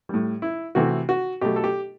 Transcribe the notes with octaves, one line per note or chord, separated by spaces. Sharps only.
A2 G3
E4
C3 E3 A3 F#4
F#4
B2 F#3 A3 G4
A4
G4